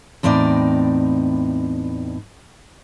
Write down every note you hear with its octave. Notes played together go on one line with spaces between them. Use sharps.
E2 A2 C4 D#4 D5